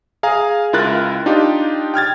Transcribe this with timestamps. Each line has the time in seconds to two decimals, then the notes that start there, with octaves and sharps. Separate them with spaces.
0.23 G#4 F5 G#5 A#5
0.73 C#2 E4 F4 A#4 F#6 A6
1.26 D4 D#4 F4 G4
1.94 G5 F6 G#6 A6